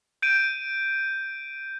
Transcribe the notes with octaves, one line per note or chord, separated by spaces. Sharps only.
G6 D7 D#7